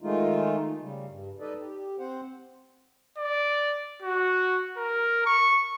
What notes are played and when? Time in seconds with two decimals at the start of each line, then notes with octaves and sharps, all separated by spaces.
0.02 D#3 G#3 A3 D#4 F4
0.81 C#3 G3
1.07 G2
1.40 D#4 A4 B4 D5 D#5
1.59 G4
1.99 C4 C5 F#5
3.18 D5
4.02 F#4
4.77 A#4
5.26 C#6